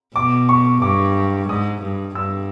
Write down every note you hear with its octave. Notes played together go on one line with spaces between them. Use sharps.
B2 D6
C#6
G2 D6
G#2 D#6
G2
G2 E6